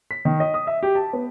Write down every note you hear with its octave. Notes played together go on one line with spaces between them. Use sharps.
B6
D#3
D#5
D#6
E5
G4
A5
B3